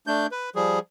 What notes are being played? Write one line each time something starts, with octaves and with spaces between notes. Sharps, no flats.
A3 D4 G6
B4
F3 G3 G#4